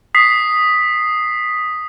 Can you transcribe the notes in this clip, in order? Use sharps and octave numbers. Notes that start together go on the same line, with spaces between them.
D#6 B6 C7